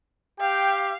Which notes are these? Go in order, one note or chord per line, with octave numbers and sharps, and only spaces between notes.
G4 F5 G5